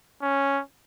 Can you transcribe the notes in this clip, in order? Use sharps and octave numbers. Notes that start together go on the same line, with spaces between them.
C#4